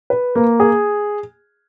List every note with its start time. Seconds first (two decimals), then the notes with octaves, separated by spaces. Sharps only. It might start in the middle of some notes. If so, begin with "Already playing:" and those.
0.10 B4
0.35 A#3
0.60 G#4